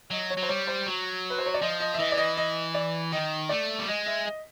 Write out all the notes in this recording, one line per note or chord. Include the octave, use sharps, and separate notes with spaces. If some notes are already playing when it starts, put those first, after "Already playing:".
F#3 D#5
C#5
F#3
C5
G3 C#5
C5
F#3
B4
C5
C#5
D5
F3 D#5
D#5
E5
E3 D#5
D5
D#5
D#5
D5
D#3 D#5
A3 D5
G3
G#3 D#5
E5
D#5